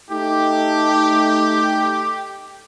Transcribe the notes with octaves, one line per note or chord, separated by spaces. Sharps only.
A3 D#4 G4